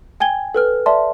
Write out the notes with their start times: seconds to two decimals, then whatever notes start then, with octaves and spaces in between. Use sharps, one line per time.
0.20 G5 G#5 G#6 G7
0.54 A4 B4 F6
0.86 D5 E5 A5 C6